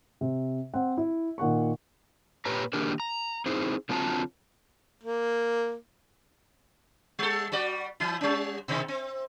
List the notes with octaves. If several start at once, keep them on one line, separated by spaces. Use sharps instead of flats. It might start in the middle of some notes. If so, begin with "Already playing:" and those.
C3
C4 F#5
E4
A#2 D#3 F#5 C#6
A#2 G4 B4 C#5 A#5
D#3 A#3 D4 G4 G#4 A#4
A#5
C4 D#4 E4 G#4 C5
D3 F#3 C4 F4 A5 A#5
A#3
G3 A4
G3 F#4 D5
E3 E4
G3 C#4
B2 D#3 C4
C4